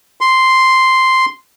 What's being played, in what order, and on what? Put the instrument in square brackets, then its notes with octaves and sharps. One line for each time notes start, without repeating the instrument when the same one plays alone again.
[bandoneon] C6